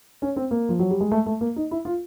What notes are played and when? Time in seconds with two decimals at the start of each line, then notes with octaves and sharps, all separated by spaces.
0.22 C#4
0.36 C4
0.51 A#3
0.69 F3
0.79 F#3
0.91 G3
1.01 G#3
1.12 A3
1.26 A3
1.41 A#3
1.56 D#4
1.71 E4
1.85 F4